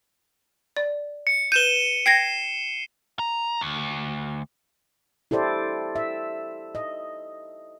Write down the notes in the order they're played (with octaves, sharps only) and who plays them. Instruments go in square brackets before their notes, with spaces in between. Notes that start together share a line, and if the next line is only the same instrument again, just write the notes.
[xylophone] D5
[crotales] C#7
[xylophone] B4 G6 [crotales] D#7 E7 G7
[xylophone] G5 G#6 A#6 [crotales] C7
[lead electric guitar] A#5
D2
[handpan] E4 G4 A4 C5 D5
E5
D#5